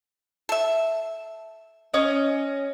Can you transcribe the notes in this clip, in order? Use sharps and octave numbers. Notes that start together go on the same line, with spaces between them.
A4 E5
C#4 D#5